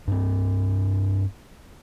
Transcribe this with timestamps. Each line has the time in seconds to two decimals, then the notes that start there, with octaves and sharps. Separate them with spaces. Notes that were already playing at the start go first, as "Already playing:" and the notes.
0.07 G2 C4